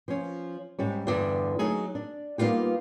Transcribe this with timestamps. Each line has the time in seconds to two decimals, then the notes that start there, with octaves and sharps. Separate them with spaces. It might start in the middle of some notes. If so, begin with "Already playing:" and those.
0.08 F3 C#4
0.79 G#2 G3 C#4
1.07 E2 G2 D3 B3 D4
1.59 F#3 A3 D#4 G#4
1.95 D4
2.38 G3 A#3 B3 D#4 F4 G4